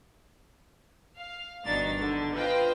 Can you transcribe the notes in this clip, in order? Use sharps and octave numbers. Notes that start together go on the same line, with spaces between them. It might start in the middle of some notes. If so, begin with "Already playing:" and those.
F5
G1 B2 D#3 D4 D#4 A6
D3
F4 B4 C5 D#5 F5 G5